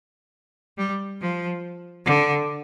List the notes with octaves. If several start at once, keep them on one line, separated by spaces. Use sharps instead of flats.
G3
F3
D3